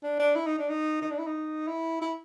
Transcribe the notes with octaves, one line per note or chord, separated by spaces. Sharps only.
D4
D4
E4
D#4
D4
D#4
D#4
D4
E4
D#4
E4
E4